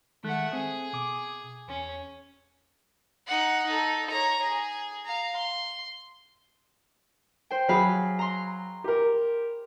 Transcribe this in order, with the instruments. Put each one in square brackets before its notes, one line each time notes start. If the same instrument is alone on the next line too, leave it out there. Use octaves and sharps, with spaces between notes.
[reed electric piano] D#3 G#3 F#6 [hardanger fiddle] A3 F#5
[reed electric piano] C4 [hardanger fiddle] G#4
[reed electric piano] B2 D6
[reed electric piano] E2 [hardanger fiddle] C#4
[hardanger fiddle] D#4 F#5
D#4 A4
C#5 A#5
G#4
F5 A#5
C6
[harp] C5 G5
[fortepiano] F#3 [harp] G#4 F5 B5
[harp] A#5 C6
[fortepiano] G4 A#4